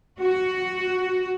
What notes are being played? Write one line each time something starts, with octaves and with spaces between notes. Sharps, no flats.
F#4